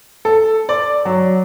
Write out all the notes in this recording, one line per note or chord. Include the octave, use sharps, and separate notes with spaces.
A4
D5
F#3